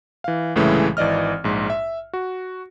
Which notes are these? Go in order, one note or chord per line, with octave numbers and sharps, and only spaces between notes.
E3 F5
C2 A2 C#3 E3 G#3 A3
G#1 E3 D5 D#5 F6
A#1 G#2
E5
F#4